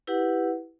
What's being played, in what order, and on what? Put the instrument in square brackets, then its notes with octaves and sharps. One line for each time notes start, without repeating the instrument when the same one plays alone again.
[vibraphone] E4 G4 B4 F#5